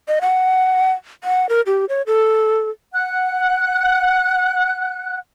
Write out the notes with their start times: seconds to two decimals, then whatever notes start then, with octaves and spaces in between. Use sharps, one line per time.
0.08 D#5
0.21 F#5
1.24 F#5
1.49 A#4
1.66 G4
1.89 C#5
2.07 A4
2.93 F#5 F#6